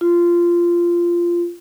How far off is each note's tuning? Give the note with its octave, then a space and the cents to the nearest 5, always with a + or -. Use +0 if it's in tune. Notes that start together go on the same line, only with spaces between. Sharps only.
F4 -15